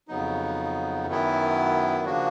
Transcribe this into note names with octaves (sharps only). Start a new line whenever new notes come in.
F2 C#3 F#3 B3 D#4
F#2 D#3 F#3 B3 E4
C#3 F3 A#3 D4 F#4